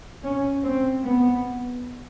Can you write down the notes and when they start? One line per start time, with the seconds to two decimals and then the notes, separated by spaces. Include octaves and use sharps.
0.24 C#4
0.64 C4
1.04 B3